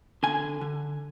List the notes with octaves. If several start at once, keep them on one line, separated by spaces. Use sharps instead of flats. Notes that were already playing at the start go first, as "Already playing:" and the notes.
D3 G#5
D3